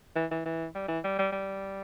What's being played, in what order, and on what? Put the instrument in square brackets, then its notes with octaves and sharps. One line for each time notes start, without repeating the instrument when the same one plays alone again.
[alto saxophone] E3
E3
E3
G3
E3
G3
G3
G3